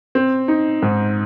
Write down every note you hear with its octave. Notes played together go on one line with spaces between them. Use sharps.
C4
D#4
G#2